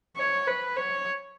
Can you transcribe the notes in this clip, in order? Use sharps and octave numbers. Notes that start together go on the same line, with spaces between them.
C#5
B4
C#5